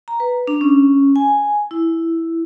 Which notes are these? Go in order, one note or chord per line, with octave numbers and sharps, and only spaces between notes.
A#5
B4
D4
C#4
G#5
E4